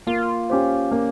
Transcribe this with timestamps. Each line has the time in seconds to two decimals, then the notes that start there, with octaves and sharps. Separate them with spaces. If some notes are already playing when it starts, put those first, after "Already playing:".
0.07 A#3 F4
0.50 C#4 G4 C5
0.91 A#3 C#4